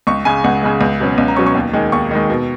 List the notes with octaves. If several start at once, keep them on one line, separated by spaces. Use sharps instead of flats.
C#2 C#6
C#3 G#3 G#5
C#2 F#5
C#3 G#3
C#2
B2 F#3 C#4
C#2
A#5
B2 F#3 C#4 C#6
C#6
D#2
D#3 G#3
D#2 C#6
D#3 G#3
B2